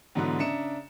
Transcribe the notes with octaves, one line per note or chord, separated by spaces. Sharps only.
G#2 D3 E3 F#3 B3
C#3 D4 E5 A#5 C#7 E7